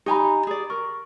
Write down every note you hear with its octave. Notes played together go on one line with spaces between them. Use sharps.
D#4 G4 G#5 A#5 B5
G#4 D5
A#4 C#6